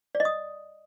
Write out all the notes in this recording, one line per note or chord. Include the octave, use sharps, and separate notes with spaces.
D5
D#5
D#6